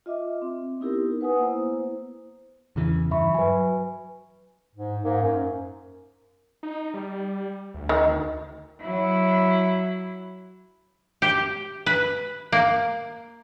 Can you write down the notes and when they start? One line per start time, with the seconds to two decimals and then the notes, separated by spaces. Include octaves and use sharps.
0.06 F4 D#5 E5 D6
0.42 C4
0.80 B3 D#4 E4 G4 A#4
1.21 B4 F#5 G#5 D#6
1.39 A#3 B3 E4 C5
2.76 E2 C#3 E3
3.11 G2 E3 E5 B5 C#6
3.34 F#3 B4 G#5
4.75 G#2
5.04 G#2 A#3
5.22 F#2
6.63 D#4
6.94 G3
7.74 D2
7.89 D#3
8.81 F#3 E4
11.22 G4
11.86 B4
12.52 A#3